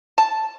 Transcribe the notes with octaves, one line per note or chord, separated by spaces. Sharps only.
A5